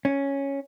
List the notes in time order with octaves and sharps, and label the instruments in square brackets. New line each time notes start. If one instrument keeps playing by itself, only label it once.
[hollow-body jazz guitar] C#4